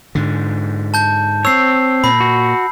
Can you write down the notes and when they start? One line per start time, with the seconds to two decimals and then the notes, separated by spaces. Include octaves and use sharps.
0.15 G#2 D3
0.94 A5 G6
1.45 C4 C#5 E6 C7
2.04 A#2 B5
2.20 F#4